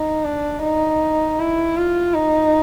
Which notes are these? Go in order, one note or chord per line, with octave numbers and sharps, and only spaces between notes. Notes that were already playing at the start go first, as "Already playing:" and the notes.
Already playing: D#4
D4
D#4
E4
F4
D#4